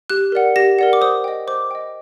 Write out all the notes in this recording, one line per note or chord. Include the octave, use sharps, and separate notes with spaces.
G4 F#6
A#4 D5 F#5
G4 A#6
A#4 D5 F#5
D6
C5 D#6
D#5 G5
C5 D6
D#5 G5